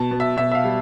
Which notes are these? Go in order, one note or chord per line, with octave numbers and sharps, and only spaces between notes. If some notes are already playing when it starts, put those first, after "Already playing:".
Already playing: B2 A5
B2
E5
B2 E5
E5
F5
G3